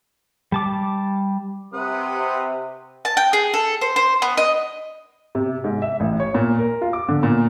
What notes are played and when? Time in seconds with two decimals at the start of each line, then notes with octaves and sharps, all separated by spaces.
0.52 G3 A5 D6
1.73 C3 B4 F#5 D#6
3.05 A5
3.17 G5
3.33 G#4
3.54 A4
3.81 C5
3.96 C5
4.22 B3
4.37 D#5
5.35 C3
5.64 G#2
5.82 E5
6.00 A1
6.20 C#5
6.34 A#2
6.59 A#4
6.81 F4
6.93 D6
7.09 D3
7.23 A#2